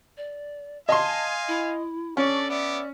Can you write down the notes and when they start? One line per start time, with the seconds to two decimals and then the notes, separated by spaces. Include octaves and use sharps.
0.17 D5
0.89 D#5 F5 G#5 A5 C6
1.48 E4
2.17 C#4 D4 A4 D5 C#6
2.49 B3 D5 E5 D6